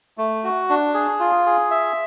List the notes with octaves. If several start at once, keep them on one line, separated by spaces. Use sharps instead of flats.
A3
F#4
D4
G#4
F4
G#4
E5